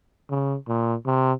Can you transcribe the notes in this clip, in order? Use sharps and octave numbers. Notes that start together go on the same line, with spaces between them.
C#3
A#2
C3